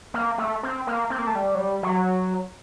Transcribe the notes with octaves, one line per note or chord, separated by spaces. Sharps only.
A#3
A3
C4
A#3
C4
A#3
A3
G3
F#3
G3
F#3